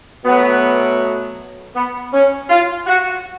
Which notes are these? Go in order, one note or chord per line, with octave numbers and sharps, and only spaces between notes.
B2 F#3 A3 B3
B3
C#4
F4
F#4